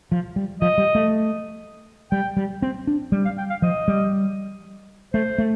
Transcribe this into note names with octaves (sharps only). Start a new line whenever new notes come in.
F3
G3
F3 D#5
G3
A3
G3 G5
G3
C4
D4
G3
F5
G5
F5
F3 D#5
G3
A3 C5
A3